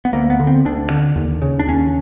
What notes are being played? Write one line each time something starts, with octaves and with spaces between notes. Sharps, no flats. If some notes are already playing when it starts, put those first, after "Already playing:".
B3
D2 A#3
B3
D3
C4
D2 D4
D3
D#2
C#3
D4
D#2 C#4